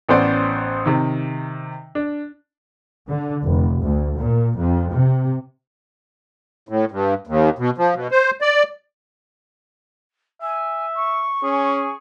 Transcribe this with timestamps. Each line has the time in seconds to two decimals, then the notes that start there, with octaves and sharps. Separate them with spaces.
0.09 A1 B3 C#4 C5 D5 C6
0.86 C3 D#3
1.95 D4
3.07 D3
3.43 F1
3.82 D2
4.17 A#2
4.57 F2
4.92 C3
6.69 A2
6.91 G2
7.27 D#2
7.59 B2
7.78 F3
7.94 B2
8.11 C5
8.41 D5
10.42 E5 G#5
10.95 C#6
11.43 C#4 G#4